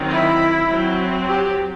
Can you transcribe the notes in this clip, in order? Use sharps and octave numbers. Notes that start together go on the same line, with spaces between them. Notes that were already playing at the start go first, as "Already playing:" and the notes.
Already playing: D#3 F#3 C4
E4
F#3 C4
G4